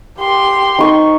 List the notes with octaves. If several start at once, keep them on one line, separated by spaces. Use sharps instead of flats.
G4 C6
D#4 C#6